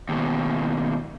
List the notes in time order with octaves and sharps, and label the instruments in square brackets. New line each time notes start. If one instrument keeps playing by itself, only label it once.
[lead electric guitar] D#2 B2